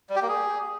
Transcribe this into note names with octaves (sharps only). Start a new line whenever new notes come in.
G3
G4
A#3
G#4